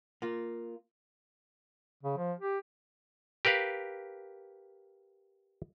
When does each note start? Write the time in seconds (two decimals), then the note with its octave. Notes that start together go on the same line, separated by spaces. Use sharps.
0.22 A#3 F4
2.03 C#3
2.17 F3
2.39 G4
3.45 G4 A#4 B4 F5